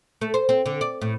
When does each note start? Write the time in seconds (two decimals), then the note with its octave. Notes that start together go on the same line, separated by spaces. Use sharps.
0.21 A3
0.34 C5
0.49 C4
0.66 D3
0.81 D5
1.02 A2